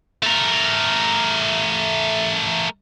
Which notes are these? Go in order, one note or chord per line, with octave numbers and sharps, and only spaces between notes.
A3 A#4